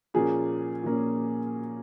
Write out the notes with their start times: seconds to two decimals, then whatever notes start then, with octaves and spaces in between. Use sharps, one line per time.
0.14 A#2 F3 A#3 C#4 G#4
0.83 A#2 F3 A#3 C#4